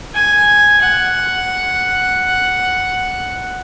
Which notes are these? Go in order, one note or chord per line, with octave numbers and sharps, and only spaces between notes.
G#5
F#5